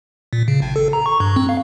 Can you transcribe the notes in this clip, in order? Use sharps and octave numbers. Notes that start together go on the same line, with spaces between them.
A#2
C#3
G#1
A4
A#5
C#6
G2
C4
F5